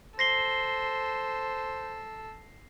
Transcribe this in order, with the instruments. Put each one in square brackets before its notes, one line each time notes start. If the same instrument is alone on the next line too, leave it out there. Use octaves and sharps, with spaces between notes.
[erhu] A4 [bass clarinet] C5 [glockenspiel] A#6 C7 G7